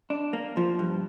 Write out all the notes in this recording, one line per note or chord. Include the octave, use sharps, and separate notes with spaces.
D4
A#3
F3
G2